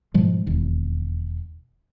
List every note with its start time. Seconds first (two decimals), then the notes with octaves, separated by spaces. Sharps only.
0.14 G#2 B2 F3 G#3
0.46 E1 D#2